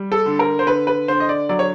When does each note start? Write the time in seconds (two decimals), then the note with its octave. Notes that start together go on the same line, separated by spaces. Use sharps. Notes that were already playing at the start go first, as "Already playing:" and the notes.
Already playing: G3
0.12 A4
0.26 D3
0.39 A#4
0.59 C5
0.67 D3 B4
0.87 B4
1.08 D3 C5
1.20 D#5
1.29 D5
1.49 F#3 D5
1.59 C#5